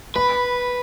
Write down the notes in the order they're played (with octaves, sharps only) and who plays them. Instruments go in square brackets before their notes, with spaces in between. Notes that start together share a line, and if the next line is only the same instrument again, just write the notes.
[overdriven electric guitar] B4 [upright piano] B5